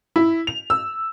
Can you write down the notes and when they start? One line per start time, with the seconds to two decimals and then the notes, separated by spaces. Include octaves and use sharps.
0.16 E4
0.47 F7
0.70 E6